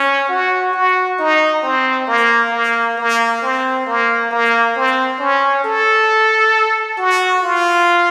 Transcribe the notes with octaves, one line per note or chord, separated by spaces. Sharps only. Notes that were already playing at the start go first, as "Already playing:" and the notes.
Already playing: C#4
F#4
F#4
D#4
C4
A#3
A#3
A#3
C4
A#3
A#3
C4
C#4
A4
F#4
F4